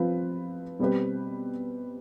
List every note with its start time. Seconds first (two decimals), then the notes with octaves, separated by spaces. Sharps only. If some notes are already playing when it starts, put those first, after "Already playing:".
Already playing: F3 C4 F4 B4
0.79 B2 G3 C4 G4 B4